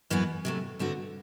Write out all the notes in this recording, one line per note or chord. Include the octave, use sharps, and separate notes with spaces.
F#2 E3 B3 F#4
C3 F#3 A3
G2 D3 A3 C4 F#4